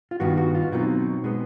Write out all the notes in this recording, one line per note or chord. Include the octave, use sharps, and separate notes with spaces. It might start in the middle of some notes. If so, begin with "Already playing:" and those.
F4
G2 D#3 G3 B3 F#4
F#4
F4
B2 F#3 A3 C4 D#4
B2 G#3 B3